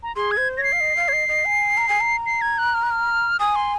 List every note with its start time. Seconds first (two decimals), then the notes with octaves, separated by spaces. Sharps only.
0.03 A#5
0.16 G#4 C6
0.31 G#6
0.37 C5
0.57 C#5 A#6
0.63 C7
0.73 F5
0.80 D#5
0.97 F5
1.08 C#5
1.13 D#5
1.28 D#5
1.45 G#5
1.77 A#5
1.88 G#5
2.01 A#5
2.26 C7
2.41 G#6
2.58 F#6
2.74 F6
2.83 F#6
2.91 F6
3.40 G#5 D#6
3.56 C6